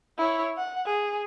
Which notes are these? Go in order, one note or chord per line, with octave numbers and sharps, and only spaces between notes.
E4 C#5
F#5
G#4